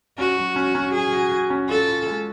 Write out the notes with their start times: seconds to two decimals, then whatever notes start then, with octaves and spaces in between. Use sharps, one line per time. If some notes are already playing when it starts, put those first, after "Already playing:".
0.18 C#4 F#4
0.37 F#3
0.56 C#4
0.75 C#4
0.94 F#3 G#4
1.13 F#4
1.32 F#4
1.50 C#4
1.69 F4 A4
1.88 F4
2.06 G#3